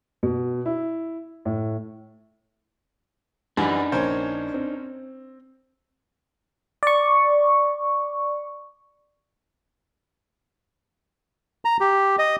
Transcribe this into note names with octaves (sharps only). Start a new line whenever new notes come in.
B2
E4
A2
F#2 E3 G3 D4 D#4 G#5 B5
A#1 C#4 A#4 C5 G#6
C4
D5 C#6
A#5
G4
D#5